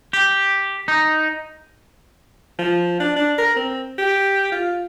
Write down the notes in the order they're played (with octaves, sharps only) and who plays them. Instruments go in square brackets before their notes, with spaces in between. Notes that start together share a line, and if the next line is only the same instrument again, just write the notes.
[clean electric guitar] G4
D#4
[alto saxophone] F3
D4
D4
A#4
C4
G4
F4